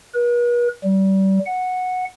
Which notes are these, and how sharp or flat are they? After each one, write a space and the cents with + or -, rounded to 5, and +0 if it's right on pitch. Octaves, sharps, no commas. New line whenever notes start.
B4 -45
G3 -30
F#5 -10